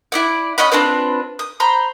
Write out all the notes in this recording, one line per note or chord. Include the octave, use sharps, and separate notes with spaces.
E4 D5 F#5
C#4 D#5 F#5 B5
C4 D4 F4 B4
D#6
C5 A#5 B5